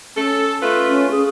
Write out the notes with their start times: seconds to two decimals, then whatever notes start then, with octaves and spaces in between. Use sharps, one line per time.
0.16 C#4 A4
0.61 A3 F4 B4
0.89 C#4
1.11 G#4